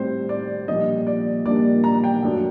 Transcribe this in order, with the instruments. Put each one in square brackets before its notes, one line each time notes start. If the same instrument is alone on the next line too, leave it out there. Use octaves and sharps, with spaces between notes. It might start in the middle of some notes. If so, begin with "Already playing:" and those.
Already playing: [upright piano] A2 G3 C4 C5
D5
A#1 A#2 G3 A#3 D4 D#5
D5
A#1 A#2 G3 A#3 D4 D5
A#5
G5
F#2 F#3 A3 D4